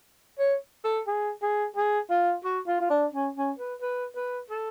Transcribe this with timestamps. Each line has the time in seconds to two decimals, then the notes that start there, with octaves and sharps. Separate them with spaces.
0.39 C#5
0.84 A4
1.07 G#4
1.42 G#4
1.76 G#4
2.10 F4
2.44 F#4
2.67 F4
2.81 F4
2.90 D4
3.13 C#4
3.36 C#4
3.58 B4
3.81 B4
4.15 B4
4.50 A4